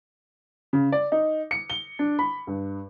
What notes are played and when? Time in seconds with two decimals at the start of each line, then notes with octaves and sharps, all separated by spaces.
0.73 C#3
0.92 D5
1.12 D#4
1.51 C#7
1.70 G7
1.99 D4
2.19 B5
2.47 G2